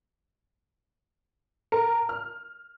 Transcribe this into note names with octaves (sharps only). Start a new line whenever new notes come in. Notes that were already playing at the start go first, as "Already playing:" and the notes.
A#4 A5
F6